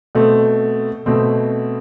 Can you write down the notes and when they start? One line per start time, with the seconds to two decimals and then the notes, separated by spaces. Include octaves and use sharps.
0.15 B2 A3 C4
1.06 B2 A3 C4